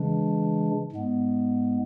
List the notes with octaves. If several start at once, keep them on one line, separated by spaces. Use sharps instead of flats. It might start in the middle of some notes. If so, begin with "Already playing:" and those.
Already playing: C#3 E3 G#3 D4
G#2 G#3 B3